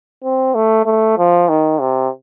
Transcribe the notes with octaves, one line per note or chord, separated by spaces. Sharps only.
C4
A3
A3
F3
D#3
C3